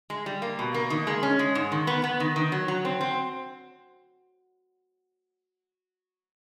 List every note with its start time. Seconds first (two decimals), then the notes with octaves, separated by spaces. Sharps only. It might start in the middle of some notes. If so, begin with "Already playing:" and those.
0.10 G#3
0.26 G3
0.42 A#3
0.59 B2
0.74 A#3
0.90 D#3
1.07 G#3
1.23 C#4
1.39 G#3
1.55 G#2
1.72 D#3
1.87 B3
2.04 B3
2.20 D#3
2.36 D#3
2.52 F#3
2.68 F#3
2.85 C4
3.01 C4